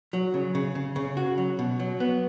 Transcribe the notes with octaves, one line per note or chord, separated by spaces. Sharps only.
F#3
C#3
C#3
C#3
C#3
F#4
F#3
B2
F#3
B3